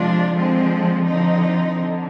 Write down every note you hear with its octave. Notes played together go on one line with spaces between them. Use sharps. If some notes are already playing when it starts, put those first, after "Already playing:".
Already playing: C3 F3 G#3 D4 F4
D3 F3 G#3 C4
D3 F3 C4 D#4
D3